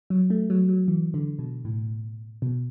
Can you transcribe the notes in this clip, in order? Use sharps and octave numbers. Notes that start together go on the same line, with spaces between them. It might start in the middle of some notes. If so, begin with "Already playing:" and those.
F#3
A3
F#3
F#3
E3
D3
B2
A2
B2